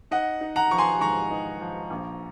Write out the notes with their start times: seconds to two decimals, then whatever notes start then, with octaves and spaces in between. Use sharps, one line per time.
0.11 D#4 D#5 F#5
0.41 D#4
0.56 F#5 A#5
0.71 F3 C#6
0.78 G#5 C6
1.01 G#2 A#5 C#6
1.31 D#4
1.61 F3
1.90 A#1